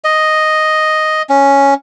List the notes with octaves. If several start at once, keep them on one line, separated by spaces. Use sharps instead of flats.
D#5
C#4